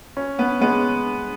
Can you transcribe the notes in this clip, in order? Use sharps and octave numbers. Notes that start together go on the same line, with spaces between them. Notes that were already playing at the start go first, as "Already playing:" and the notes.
C#4
B3
G#3 B3